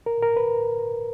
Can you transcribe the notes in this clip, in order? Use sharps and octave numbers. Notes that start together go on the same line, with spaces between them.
A#4
A#4
B4